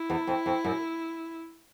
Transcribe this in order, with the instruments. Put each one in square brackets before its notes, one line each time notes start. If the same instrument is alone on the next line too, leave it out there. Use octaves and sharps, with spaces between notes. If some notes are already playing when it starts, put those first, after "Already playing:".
Already playing: [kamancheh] E4
[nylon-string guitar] E2
F2
F2
F#2